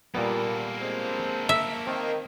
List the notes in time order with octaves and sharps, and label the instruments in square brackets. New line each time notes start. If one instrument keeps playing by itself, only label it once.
[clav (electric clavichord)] A#2 G3 B3 [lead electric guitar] A#3 A4
[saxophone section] G#3 C4
[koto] E5
[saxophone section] D#3 [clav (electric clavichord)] C4